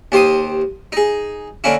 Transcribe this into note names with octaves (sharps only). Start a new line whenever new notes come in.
D#2 G4 C5 C6 D#6
D#4 G#4
D3 A#3 C#4 E4